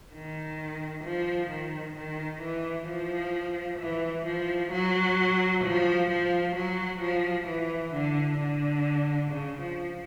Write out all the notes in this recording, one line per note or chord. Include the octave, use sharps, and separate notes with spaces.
D#3
F3
D#3
D#3
E3
F3
E3
F3
F#3
F3
F3
F#3
F3
E3
D3
D3
C#3
F3